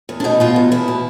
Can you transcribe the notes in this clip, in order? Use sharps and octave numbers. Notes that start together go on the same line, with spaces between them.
E2
D4
B2 D#4
B2 F4
E2
E2 E4
B2